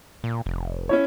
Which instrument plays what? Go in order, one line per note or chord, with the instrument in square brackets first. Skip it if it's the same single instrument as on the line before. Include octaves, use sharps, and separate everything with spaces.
[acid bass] A#2
F1
[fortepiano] C#4 E4 C#5